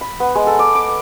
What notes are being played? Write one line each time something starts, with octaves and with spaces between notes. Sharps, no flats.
B5
B3
G#3
A4
D6
D6